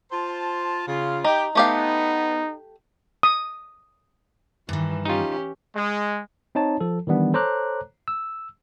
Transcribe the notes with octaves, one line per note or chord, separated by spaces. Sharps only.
F4 C5 A5
C#3 F4
D#4 G4
A3 B3 D#4 G4 F5
D#6
G2 D#3 E3
C#4 D#4 F4 G4
G#3
C4 D#4 C#5 A5
F3 A4
D#3 E3 G3 B3 D4
A4 C5 C#5 A#5 D6 F#6
E6